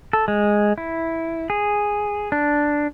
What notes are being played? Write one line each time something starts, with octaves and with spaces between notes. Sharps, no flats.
A4
G#3
E4
G#4
D4